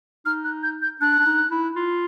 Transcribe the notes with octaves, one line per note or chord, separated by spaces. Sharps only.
D#4 F6
F#6
G6
G6
D4 F#6
D4
D#4
E4
F4